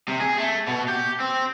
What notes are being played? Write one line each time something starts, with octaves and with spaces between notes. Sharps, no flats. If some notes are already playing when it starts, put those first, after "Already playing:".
C3
G#4
A3
B2
G4
C4